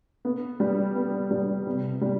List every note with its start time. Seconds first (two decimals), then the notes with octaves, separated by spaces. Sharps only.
0.25 B3
0.60 G3
0.95 B3
1.31 G3
1.67 C3
2.01 G3